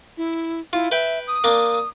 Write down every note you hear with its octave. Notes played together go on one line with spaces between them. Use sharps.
E4
E4 F4
B4 E5 G5
D#6
A#3 D4